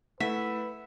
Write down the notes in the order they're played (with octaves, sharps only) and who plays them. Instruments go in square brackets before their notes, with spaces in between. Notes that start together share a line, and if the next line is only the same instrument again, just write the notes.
[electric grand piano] A3 E4 [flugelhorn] B4 [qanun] E5 [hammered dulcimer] F#5